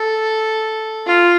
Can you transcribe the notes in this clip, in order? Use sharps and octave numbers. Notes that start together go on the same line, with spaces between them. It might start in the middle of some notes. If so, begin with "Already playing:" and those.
Already playing: A4
F4